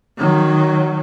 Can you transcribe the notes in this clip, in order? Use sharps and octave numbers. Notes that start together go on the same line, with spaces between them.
D#3 F#3